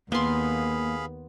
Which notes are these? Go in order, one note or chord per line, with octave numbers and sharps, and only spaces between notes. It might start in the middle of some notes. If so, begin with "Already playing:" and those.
D#2 A#3 B3 G#4 F5 B5 C6